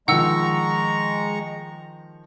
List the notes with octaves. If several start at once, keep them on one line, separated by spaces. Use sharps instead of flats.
D#3 F3 G#3 F#5 A#5 C#6 E6